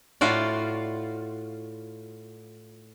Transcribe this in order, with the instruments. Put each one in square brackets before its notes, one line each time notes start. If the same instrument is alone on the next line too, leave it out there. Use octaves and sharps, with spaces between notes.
[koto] A2 F4 F#4 D5